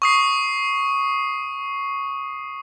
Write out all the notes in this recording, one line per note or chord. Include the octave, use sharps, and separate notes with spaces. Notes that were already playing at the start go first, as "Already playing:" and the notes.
C#6 D#6 C7